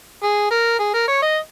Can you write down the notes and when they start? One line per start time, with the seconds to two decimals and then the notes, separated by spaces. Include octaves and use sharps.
0.23 G#4
0.51 A#4
0.79 G#4
0.94 A#4
1.08 C#5
1.22 D#5